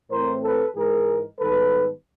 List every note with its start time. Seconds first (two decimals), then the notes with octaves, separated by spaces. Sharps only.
0.10 A2 E3 A3 C4 A#4 C5
0.43 A4 B4
0.75 G#2 E3 G#3 G#4 A#4
1.39 G#2 D#3 G3 B3 A4 B4